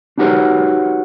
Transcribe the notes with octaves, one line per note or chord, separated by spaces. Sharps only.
D4 D#4 F#4 G4 B4 C#5